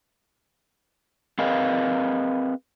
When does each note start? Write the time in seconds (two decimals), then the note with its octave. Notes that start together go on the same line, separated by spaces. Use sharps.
1.38 C4 G#4 A#4 B4 D#5 F5